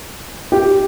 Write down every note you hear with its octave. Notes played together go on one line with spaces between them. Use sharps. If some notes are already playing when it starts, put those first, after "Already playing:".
G4